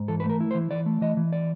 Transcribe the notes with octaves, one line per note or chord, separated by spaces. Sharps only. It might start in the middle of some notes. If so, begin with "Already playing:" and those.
Already playing: G#2
E3 A4
B4
A3
A#4
E4
C5
E3
E3 D5
A3
E3 D#5
E3
D5